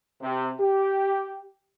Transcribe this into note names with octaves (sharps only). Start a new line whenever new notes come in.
C3
G4